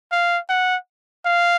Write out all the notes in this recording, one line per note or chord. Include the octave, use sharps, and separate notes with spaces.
F5
F#5
F5